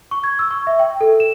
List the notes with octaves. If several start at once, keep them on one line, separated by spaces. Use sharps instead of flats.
C#6
G#6
E6
C#6
E5
G5
A4
E7